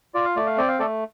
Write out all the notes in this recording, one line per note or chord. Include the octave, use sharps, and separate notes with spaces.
F4 D5
F5
A3 D5
F5
C4 D5
F5
A3 A4 D5